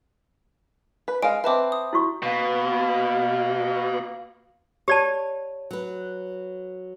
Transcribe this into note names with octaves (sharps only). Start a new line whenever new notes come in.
B4
G#3 F5 D7
C4 B4 E5 A5 D6
D#6
E4 F#4 C#6
B2 A#3
G4 C#5 D5 A5
F#3 B4